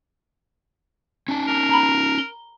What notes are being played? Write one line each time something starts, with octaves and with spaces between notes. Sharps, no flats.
C#4 D#4 A5
A#4
A#5 B5
G7